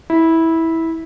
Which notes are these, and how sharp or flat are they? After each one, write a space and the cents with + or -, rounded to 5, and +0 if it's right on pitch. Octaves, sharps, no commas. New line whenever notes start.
E4 -15